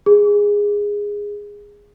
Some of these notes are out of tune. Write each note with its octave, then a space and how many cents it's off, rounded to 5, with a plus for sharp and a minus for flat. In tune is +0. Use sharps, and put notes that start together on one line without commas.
G#4 -15